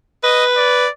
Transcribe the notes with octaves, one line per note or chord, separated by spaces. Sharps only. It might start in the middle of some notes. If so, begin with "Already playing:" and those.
B4 D#5
D5